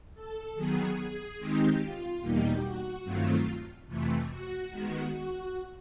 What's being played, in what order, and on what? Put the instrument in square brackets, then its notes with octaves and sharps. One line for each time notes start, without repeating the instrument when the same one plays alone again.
[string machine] A4
D#3 F#3 B3 G#4
G#4
D#3 G#3 C4 D#4 G4
F4
E2 B2 G3 A#3 D#4 G4
F#4
G2 D#3 F#3 A3 C4 F4
F2 C3 E3 A3
F#4
D#3 G#3 B3
F#4